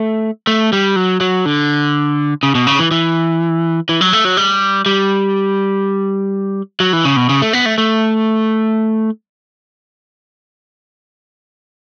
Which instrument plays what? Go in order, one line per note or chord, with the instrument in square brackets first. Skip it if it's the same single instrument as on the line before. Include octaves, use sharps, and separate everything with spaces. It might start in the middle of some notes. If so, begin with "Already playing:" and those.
Already playing: [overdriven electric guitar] A3
A3
G3
F#3
F#3
D3
C#3
B2
C#3
E3
E3
E3
F#3
A3
F#3
G3
G3
F#3
E3
C#3
B2
C#3
A3
B3
A3
A3